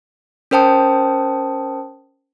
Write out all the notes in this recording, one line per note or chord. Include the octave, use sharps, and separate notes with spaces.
C#4 A#4 C5 G5 A5 D#6